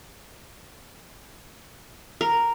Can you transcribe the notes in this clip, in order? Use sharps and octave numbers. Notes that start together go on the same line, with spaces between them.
A#4